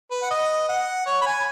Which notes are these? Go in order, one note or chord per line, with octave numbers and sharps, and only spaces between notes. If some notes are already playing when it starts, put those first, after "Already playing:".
B4
F#5
D#5
F#5
C#5
B5
G#5